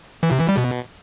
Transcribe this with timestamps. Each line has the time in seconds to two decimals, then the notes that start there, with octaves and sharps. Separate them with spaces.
0.23 E3
0.31 C3
0.40 E3
0.49 G3
0.57 B2